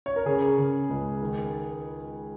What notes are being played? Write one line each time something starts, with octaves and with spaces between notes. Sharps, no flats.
C#5
A#4
C#3 G#4
C#3
C#2
D#3